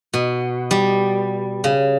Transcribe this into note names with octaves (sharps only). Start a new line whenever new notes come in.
B2
G3
C#3